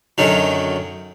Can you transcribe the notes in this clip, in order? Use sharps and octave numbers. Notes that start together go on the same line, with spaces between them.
F#2 D3 D#3 F#3